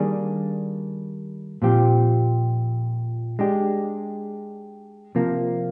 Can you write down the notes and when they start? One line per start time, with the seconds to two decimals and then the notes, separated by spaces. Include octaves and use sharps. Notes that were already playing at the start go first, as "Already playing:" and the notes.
Already playing: D#3 G3 A#3 D4 G#4
1.62 A#2 F3 C4 G4
3.39 G#3 D4 G4
5.15 C3 F3 A#3